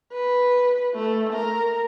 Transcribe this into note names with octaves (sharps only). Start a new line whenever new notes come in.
B4
A3
A#4